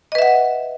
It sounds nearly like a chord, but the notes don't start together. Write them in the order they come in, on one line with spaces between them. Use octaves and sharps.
D#5 B4 E5 F#5